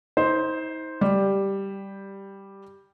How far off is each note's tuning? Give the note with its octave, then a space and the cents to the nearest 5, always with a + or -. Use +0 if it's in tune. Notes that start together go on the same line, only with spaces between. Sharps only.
D#4 +40 C5 +0
G3 +0 G4 +5